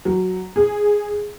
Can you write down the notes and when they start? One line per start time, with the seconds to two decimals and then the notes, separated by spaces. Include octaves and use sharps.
0.05 F#3
0.56 G#4